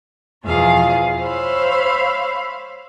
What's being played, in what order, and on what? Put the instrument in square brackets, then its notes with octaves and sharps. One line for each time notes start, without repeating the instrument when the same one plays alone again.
[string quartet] E2 B2 F3 F4 G#4 F5
C5 C#5 E5 F5 B5